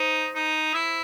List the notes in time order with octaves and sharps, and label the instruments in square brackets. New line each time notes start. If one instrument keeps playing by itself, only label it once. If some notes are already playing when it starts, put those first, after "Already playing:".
Already playing: [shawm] D#4 [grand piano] C5
[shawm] D#4
E4